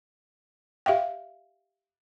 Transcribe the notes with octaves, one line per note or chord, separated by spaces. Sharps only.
G4 E5 F5 G5